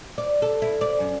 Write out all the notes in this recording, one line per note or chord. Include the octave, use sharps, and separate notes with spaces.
D5
A4
E4
D5
F#2